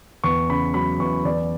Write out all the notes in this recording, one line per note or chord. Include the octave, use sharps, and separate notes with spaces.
E2 C#6
C#3 B5
F#3 B5
E2 C#6
E2 D5